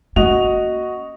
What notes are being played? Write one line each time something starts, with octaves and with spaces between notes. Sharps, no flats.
A#3 C#4 F#4 D#5 F7